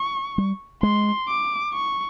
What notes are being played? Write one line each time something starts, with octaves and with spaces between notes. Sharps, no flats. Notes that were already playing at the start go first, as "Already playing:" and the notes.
Already playing: C#6
G3
G#3 C6
D6
C#6